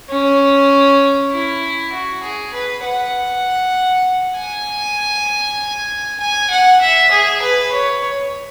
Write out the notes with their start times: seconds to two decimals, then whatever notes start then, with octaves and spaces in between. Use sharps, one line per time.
0.09 C#4
1.31 E4
1.93 F#4
2.23 G#4
2.54 B4
2.84 F#5
4.37 G#5
6.20 G#5
6.50 F#5
6.81 E5
7.11 G#4
7.42 B4
7.72 C#5